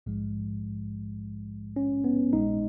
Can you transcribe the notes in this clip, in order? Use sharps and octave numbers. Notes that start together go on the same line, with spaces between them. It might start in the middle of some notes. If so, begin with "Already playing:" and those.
A#1 G#2 F3 G#3
C#4
B3
A#1 A#2 G#3 D#4